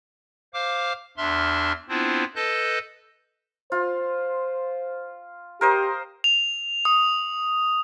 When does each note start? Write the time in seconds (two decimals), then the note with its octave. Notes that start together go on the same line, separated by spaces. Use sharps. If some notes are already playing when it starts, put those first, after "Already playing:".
0.54 C5 F5 D6 F6
1.17 E2 D4 E5 C6 F6
1.89 B3 C4 D4 E4 F4 C5
2.35 A4 B4 D#5 A5 F#6 G6
3.72 F4 C5
5.61 G4 A#4 C5 D#5
6.24 F7
6.85 D#6